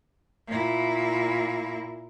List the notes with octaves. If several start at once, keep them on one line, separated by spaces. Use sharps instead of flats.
A#2 E4